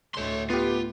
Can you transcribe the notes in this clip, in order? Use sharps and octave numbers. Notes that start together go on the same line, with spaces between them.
D2 A2 A3 C#5 C6
B3 F4 G4